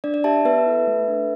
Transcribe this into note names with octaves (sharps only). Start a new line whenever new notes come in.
D4 D5
D5
G4 E5 A5
B3 B4 E5
E4 A4
A3
D4 A4